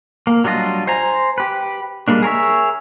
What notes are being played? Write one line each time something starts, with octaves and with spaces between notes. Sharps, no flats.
A#3
F#3 G3 D4 F4 D#5
C5 G#5 A#5
G4 B4
G3 G#3 A#3 D4
G#4 A#4 C#5 E5